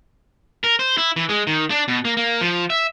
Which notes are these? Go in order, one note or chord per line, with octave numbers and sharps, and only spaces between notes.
A#4
C5
E4
E3
G#3
D#3
D4
B2
A#3
A#3
F3
E5